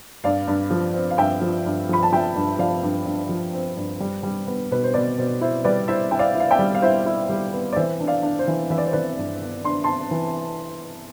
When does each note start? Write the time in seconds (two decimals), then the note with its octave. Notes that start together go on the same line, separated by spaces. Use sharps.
0.24 G2 D5 F5
0.48 G2
0.71 F3
0.94 C4
1.11 F5
1.18 G2 E5 G5
1.42 F3
1.66 G2
1.89 F3 B5
2.03 A5
2.12 F3 E5 G5
2.35 G2
2.59 F3 D5 F5
2.83 G2
3.06 G2
3.29 F3
3.53 C4
3.77 G2
4.00 G3
4.23 G3
4.47 B3
4.71 B2 B4
4.83 C5
4.94 B2 B4 D5
5.18 B2 C5
5.41 E4 C5
5.64 G3 B4 D5
5.88 E4 C5 E5
6.11 E4 G5
6.19 D5 F5
6.35 E4
6.40 F5
6.51 E5 G5
6.59 G3
6.75 F5
6.82 E4 C5 E5
7.06 E4
7.29 G3
7.53 B3
7.73 D5
7.76 E3 C5 E5
8.00 D4
8.08 D5 F5
8.23 D4
8.39 C5
8.47 E3
8.70 E3 E5
8.78 D5
8.86 C5
8.93 E3 B4 D5
9.18 G2
9.42 B3
9.64 D4 C6
9.84 D4 A5 C6
10.11 E3